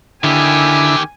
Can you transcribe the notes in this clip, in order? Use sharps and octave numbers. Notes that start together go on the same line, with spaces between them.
D3 D#3 E4 G4 G#5